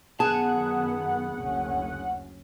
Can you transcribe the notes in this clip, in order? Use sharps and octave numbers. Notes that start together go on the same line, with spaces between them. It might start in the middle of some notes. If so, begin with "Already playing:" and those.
F#2 D#3 B3 G#4 F#5 A5
F#1 D2 C#4